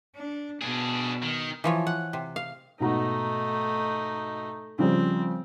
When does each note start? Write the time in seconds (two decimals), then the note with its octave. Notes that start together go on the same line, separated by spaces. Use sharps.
0.15 D4
0.62 B2 D4 G#4
1.22 D#3
1.64 E3 F3 C#5
1.87 F#5
2.13 C3
2.36 F5
2.80 G#2 B2 A3 D#4 A#5
4.79 C#3 F3 G3 C4